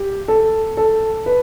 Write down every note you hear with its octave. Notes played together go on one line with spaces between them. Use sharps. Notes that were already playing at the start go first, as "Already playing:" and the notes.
Already playing: G4
A4
A4
B4